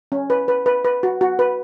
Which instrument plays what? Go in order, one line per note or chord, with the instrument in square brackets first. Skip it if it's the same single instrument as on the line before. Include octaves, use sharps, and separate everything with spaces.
[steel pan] C#4
B4
B4
B4
B4
F#4
F#4
B4